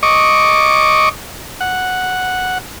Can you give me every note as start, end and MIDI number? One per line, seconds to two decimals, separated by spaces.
0.03 1.09 75
0.03 1.09 85
0.03 1.09 86
1.61 2.58 78